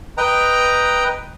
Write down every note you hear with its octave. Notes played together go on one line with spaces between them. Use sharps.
B4 D#5 G5 A#5